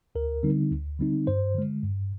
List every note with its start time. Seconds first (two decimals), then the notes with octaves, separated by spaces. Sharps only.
0.15 D2 A#4
0.43 D3 G3 C4 D#4
0.71 D2
0.99 D3 G3 C4 D#4
1.27 G2 C5
1.55 D3 G#3
1.83 G2